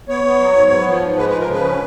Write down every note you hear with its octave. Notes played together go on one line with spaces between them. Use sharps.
B3 C#5
B3
F#3
G#2
B3
F3
G#2
G#3 B4
B4
F3
A#4
C#3 B4
C#4